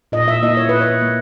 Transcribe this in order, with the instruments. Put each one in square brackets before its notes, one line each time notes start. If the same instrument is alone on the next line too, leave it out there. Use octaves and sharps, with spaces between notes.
[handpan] A#2 D#5
E5
A#3 E4 D#5
C#5
A#2 B4
C#5
A#3